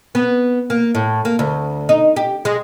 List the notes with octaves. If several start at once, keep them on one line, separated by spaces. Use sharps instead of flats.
B3
A#3
A2
A#3
D2
D#4
G4
G#3